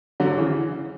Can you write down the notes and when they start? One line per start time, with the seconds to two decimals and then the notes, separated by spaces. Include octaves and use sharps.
0.20 D3 F#3
0.38 C#3 E3